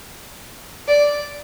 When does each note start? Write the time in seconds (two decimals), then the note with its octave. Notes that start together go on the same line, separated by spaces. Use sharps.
0.88 D5